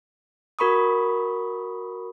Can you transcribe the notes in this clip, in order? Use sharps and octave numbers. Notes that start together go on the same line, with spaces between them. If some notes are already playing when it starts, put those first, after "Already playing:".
F#4 A#4 B5 C#6 D#6